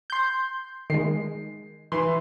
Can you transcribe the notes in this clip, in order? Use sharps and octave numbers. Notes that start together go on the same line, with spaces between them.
C6 G6
D#3 G#3 C7
E3 C6